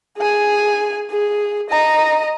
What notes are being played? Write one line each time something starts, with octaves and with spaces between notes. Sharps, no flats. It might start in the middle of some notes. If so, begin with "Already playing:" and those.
G#4 G#5
G#4
D#5 A#5